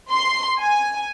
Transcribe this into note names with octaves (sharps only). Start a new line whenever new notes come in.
C6
G#5